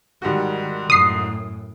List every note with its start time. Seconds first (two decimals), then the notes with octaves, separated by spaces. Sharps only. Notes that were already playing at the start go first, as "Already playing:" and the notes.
0.22 G#2 D#3 G3 F#4
0.90 F#2 A2 D#6 C7